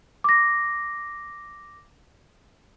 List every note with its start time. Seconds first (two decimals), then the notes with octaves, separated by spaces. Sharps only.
0.24 D6 A#6